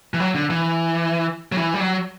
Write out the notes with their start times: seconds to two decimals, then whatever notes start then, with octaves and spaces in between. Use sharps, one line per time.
0.14 E3
0.20 F#3
0.35 D3
0.50 E3
1.52 F#3
1.57 E3
1.74 G3
1.80 F#3